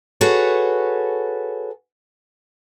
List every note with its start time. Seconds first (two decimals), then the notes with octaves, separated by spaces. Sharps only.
0.21 F#4 G#4 A4 B4 C#5